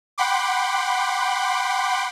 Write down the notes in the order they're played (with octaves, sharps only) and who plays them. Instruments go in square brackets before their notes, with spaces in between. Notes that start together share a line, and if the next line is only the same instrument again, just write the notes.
[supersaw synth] F#5 G5 B5 C6 D6